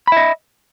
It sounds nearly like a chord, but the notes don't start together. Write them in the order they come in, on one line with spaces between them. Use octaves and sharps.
B5 E5 D#5